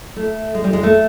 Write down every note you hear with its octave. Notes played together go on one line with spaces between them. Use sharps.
A3
G#3
G3
G#3
A3